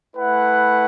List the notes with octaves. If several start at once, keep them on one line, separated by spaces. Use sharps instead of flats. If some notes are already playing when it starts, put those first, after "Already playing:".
A3 E4 B4 F#5